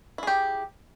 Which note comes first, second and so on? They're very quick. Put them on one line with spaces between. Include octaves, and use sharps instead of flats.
E4 G#4 G4